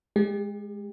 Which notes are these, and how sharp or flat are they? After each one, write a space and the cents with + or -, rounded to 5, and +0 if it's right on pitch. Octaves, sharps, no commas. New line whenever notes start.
G#3 +0 G4 +40